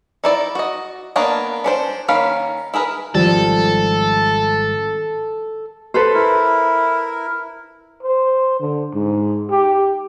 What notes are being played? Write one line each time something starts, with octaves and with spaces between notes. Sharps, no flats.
D#4 E4 D5
F#4 D#5
A#3 B3 D4 C#5 D#5
C#4 D4 C5
D#3 A#3 C#4 F5 B5
E4 G#4 A#4 B4
G#1 F3 G3 A4
A4 B4 C5
E4 A#4
C5
D3
G#2
G4